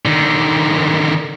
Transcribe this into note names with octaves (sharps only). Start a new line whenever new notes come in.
D3 D#3